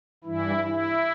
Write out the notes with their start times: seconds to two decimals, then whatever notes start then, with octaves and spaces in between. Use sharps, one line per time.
0.24 G2 E3 E4
0.64 E4